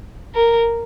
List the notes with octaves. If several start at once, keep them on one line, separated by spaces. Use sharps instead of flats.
A#4